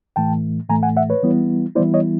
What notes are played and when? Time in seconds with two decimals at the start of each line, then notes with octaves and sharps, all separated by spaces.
0.16 A2 E3 A3 G5 A5
0.69 A2 E3 A3 G#5 A#5
0.83 F#5 G#5
0.97 E5 F#5
1.10 B4 C#5
1.23 E3 G3 B3 E4
1.75 E3 G3 B3 E4 C5 D5
1.94 C#5 D#5